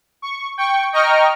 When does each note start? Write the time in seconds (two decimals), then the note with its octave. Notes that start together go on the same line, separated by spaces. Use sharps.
0.22 C#6
0.58 G5 C#6
0.93 D#5 G5 A#5 C#6 F6